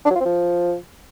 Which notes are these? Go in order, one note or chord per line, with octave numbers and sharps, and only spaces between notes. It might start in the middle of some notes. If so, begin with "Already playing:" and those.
D4
F#3
F4
C4
F3